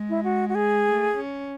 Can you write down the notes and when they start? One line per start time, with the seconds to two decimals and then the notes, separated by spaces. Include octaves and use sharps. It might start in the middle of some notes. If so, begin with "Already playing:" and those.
Already playing: G#3
0.09 E4
0.24 F#4
0.49 F#4
0.55 G#4
0.86 A3
1.17 C#4